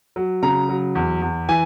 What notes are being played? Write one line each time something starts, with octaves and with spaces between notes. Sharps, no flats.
F#3
C#3 A#5
F#3
E2
E2
E3 G#5